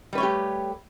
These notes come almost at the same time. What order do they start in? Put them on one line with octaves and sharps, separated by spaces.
G3 B4 C#5 A3 G4